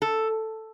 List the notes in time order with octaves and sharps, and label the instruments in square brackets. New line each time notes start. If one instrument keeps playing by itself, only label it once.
[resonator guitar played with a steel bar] A4